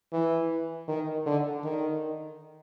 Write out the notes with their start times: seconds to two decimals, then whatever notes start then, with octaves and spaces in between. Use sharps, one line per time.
0.13 E3
0.88 D#3
1.26 D3
1.64 D#3